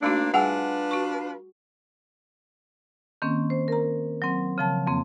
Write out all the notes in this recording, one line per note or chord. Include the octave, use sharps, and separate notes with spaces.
A3 A#3 C4 D4 D#4 F#4
G3 D4 F4 G#4 B4 F#5 G#5
F#4 C#6
D#3 A#3 C4 C#4
C5
A#4 A#5
F#3 C4
C#3 F3 A5
F2 A#3 C4